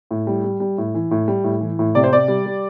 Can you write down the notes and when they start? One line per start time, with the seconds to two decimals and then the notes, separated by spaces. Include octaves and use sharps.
0.11 A2
0.27 G3
0.44 G3
0.60 G3
0.78 A2
0.94 E3
1.11 A2
1.28 G3
1.44 A2
1.61 E3
1.79 A2
1.95 C3 D5
2.04 C5
2.12 C3 D5
2.28 G3
2.46 G3